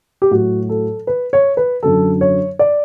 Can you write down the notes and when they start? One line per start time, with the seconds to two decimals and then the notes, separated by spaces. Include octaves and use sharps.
0.22 G4
0.31 A2 F#3 F#4
0.69 A4
1.07 B4
1.33 C#5
1.57 B4
1.83 F#2 D3 F#3 A4
2.21 C#5
2.59 D5